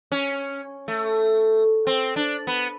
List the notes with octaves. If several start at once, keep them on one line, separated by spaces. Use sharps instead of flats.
C#4
A3
C4
D4
B3